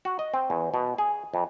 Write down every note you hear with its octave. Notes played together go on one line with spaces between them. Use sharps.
F#4
D#5
C4
E2
B2
G#4
F2